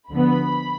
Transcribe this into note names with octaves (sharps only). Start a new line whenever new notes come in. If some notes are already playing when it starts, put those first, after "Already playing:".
D2 D3 F3 B3 B5